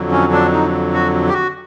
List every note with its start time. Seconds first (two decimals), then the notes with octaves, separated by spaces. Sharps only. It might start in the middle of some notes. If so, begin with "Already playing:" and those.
Already playing: F2 D3 F#3
0.12 C#4
0.33 D4
0.53 D#4
0.94 F#4
1.29 G4
1.33 F#4